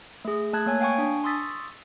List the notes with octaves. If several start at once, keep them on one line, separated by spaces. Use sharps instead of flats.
A3 G#4
A3 A5 F#6 G#6
A#3 C#5 G#5 G#6
F5 G5 G#5 C#6
D4 G#5
C6 C#6 D#6 E6 A6 B6